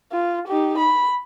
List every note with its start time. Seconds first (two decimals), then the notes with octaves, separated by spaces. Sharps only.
0.12 F4
0.47 D#4 G4
0.78 B5